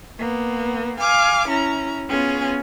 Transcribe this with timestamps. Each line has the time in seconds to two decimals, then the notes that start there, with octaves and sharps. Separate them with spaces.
0.18 A#3 B3
1.00 F5 G#5 D6 F6
1.49 C#4 E4 A#5
2.09 B3 C#4 F4 G#4